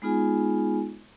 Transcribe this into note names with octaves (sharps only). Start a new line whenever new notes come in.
G#3 B3 D#4 F4 G#4 G#5